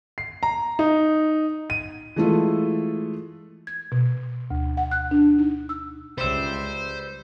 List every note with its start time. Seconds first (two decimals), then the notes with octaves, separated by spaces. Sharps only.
0.18 C7
0.43 A#5
0.79 D#4
1.70 D#7
2.16 E3 G#3 A3 E4 F4 A4
3.67 G#6
3.92 B2
4.51 D2
4.77 F#5
4.91 F#6
5.11 D4
5.38 D#4
5.69 E6
6.18 C#2 G3 C5 E5